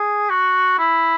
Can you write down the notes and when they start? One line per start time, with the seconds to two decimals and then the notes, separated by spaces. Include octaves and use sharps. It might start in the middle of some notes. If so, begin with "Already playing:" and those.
Already playing: G#4
0.30 F#4
0.79 E4